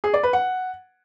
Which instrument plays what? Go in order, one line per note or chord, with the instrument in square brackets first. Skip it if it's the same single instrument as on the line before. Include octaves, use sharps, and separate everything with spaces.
[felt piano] G#4
D5
B4
F#5